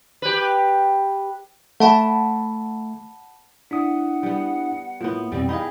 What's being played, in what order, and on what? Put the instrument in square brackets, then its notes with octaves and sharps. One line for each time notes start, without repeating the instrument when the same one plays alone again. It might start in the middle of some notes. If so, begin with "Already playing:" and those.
[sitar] G4 B4
[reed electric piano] A3 [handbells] F#5 A5 B5
[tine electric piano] D4 E4 D#6 [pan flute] F#5
[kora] G3 B3
[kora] A2 B3 [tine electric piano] A#3 F4
[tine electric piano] F2 B2 E3 [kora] G3 [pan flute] C4
[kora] D#4 G#4 [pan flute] E4 [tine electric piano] F5 G5 B5